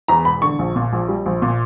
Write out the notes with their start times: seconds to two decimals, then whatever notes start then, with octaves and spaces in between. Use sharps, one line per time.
0.08 E2 A#5
0.25 E1 B5
0.42 D3 C#6
0.59 A#1
0.76 A#2
0.93 A#1
1.08 G3
1.26 A#1
1.42 A#2